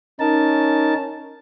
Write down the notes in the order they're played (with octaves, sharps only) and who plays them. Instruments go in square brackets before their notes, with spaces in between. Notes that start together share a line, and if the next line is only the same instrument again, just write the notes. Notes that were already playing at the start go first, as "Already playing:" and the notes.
[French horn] C#4 [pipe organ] D#4 A#4 A5